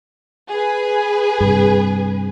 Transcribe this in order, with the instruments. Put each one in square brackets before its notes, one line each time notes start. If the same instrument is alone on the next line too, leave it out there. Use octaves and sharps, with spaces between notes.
[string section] G#4 B4
[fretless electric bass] G2 C3